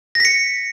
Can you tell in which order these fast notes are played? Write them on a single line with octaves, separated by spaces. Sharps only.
A#6 B6 C#7